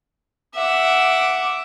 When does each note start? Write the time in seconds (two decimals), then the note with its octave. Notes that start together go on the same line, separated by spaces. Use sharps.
0.55 E5 F#5 D6